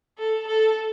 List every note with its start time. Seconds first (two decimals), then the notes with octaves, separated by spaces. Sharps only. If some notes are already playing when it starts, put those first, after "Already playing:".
0.18 A4
0.47 A4